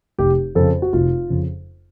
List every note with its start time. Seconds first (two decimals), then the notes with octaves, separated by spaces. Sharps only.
0.18 F1 G4
0.55 F2 C#3 A4
0.82 F#4
0.93 F1 F4
1.30 F2 C#3